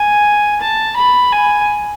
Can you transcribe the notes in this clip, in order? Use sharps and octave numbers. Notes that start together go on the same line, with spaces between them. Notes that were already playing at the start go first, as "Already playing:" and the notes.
Already playing: G#5
A5
B5
G#5